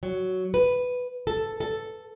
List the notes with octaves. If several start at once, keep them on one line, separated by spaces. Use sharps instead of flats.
F#3
B4
A4
A4